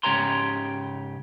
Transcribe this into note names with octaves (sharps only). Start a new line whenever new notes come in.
G#2 C#3 G4 C#5 A#5 C6